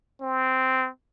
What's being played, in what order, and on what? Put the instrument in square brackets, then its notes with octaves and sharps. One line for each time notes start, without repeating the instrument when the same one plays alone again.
[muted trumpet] C4